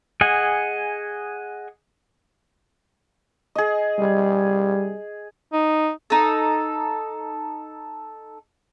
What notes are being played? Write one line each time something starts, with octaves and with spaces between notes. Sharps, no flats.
G#4 D#5 F#5 G#5
G#4 D#5
G3
D#4
D#4 A4